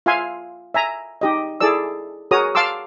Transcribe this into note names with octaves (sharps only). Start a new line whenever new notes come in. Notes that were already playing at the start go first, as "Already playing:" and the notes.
F4 E5 F5 G#5 C6
E5 G#5 A#5
D#4 G4 D#5
E4 G#4 A4 D5 E6
F#4 G#4 A#4 C#5 A#5 D#6
F5 A5 C6 D6 E6